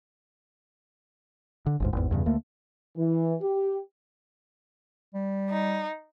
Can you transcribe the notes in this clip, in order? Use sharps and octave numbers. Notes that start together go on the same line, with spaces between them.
D3
G1 D2 G#2
G#1 E2
E2 G2 C#3
D2 A3 A#3
E3
G4
G3
D#4